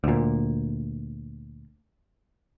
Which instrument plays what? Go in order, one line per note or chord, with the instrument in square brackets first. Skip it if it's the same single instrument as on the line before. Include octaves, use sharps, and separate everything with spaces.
[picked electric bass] D2 A#2